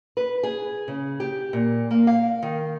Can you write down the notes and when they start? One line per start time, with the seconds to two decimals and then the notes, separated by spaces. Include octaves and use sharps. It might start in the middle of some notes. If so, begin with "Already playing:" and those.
0.17 B4
0.43 G#4
0.88 C#3
1.20 G4
1.53 A#2
1.91 A#3
2.07 F5
2.42 D#3